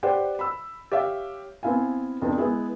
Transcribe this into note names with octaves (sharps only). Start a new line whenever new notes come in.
G4 B4 C5 D5 F#5 G5
B5 E6
G4 C#5 E5 F5
B3 C4 E4 F5 G#5
F2 B3 D4 D#4
G#3 B3 E4 G#4